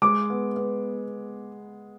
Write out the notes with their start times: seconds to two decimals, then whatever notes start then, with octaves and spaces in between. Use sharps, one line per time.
0.02 G#3 D6
0.30 B3
0.56 B3